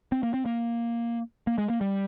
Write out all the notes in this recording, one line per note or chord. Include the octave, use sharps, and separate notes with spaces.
C4
A#3
C4
A#3
A#3
G#3
A#3
G3